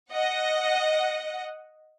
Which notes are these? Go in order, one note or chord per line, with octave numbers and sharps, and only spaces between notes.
D#5 F#5